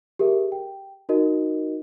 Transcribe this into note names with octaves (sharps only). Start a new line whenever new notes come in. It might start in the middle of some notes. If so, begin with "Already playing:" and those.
G4 G#4 A#4 E5
G5
D#4 F#4 A#4 D#5